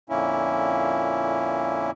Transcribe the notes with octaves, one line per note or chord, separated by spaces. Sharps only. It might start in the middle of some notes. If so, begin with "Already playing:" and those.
F2 A#2 D3 A#3 C#4 E4